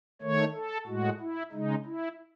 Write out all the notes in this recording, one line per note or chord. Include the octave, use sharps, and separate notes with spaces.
D#3 A3 C#5
A4
A2 G#3 F#4
E4
C#3 G#3 D#4
E4